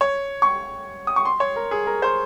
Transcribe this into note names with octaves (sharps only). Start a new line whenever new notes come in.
C#5
C#6
D#6
C#6
C6
C#5
A#4
G#4
A#4
C5